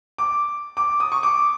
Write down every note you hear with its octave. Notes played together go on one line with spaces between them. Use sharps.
D6
D6
D#6
C#6
D6